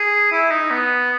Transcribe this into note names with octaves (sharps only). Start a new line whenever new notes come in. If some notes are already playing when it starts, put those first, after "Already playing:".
Already playing: G#4
E4
D#4
B3